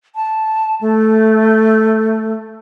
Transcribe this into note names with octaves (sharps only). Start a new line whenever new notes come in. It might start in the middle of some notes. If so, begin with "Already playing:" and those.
A5
A3